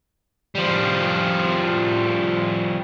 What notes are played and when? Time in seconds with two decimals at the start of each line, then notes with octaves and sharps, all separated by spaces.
0.55 F3 G3